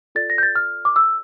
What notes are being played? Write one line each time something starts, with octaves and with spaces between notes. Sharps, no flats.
F4 A4 D5 A6
A#6
G6
A6
F6
D6
E6